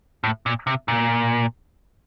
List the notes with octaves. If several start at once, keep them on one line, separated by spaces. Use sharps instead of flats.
A2
A#2
C3
A#2